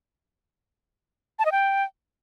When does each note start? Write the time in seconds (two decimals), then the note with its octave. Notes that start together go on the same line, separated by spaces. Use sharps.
1.39 A5
1.45 D#5
1.52 G5